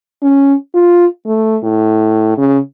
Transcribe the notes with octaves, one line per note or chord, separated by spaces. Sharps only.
C#4
F4
A3
A2
C#3